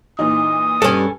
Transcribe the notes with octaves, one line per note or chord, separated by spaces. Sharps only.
A#2 E3 D#4 D#6
G2 C#4 A4 G#5